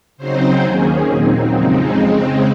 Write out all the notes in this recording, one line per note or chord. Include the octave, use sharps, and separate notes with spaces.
C#3 F#3 C4 D#4 C5
D#2 D#3 A#3 C#4 G#4
A#2 F#3 C4 D#4
F2 C#3 G#3 C4 D#4
C#3 G#3 C4